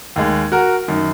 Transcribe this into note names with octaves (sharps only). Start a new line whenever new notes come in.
D#2 D#3 G#3
F#4 A#4
F#2 D#3